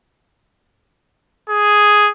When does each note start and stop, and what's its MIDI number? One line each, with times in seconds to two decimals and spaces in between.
1.50 2.11 68